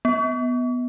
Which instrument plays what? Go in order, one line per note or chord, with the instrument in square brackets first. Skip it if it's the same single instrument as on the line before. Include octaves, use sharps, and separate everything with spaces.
[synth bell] B3